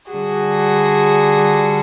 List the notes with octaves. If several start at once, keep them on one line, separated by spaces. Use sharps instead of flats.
D3 G3 F#4 G#4